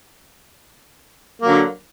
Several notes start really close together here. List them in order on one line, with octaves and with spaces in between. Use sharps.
A#3 F#3 D3